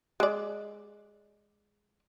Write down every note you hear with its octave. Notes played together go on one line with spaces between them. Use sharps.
G#3 D5